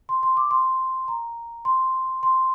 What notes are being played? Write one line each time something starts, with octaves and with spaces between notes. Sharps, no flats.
C6
C6
D6
C6
A#5
C6
C6